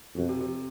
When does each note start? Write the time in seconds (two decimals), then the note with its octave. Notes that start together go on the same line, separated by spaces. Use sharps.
0.16 F2 B2
0.29 C3
0.41 C3